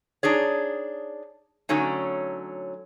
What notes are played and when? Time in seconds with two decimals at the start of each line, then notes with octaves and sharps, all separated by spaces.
0.23 D4 D#4 G#4 C#5
1.69 D3 F#3 A3 C#4 D#4